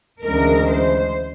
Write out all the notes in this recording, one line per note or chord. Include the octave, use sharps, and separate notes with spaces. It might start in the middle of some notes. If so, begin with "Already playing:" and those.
D2 C#3 E3 G#3 A#4
C5